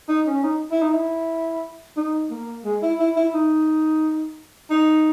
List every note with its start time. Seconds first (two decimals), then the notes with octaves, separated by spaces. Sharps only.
0.09 D#4
0.27 C#4
0.43 D#4
0.71 E4
0.82 D#4
0.93 E4
1.97 D#4
2.31 A#3
2.65 G#3
2.82 E4
2.99 E4
3.16 E4
3.34 D#4
4.70 D#4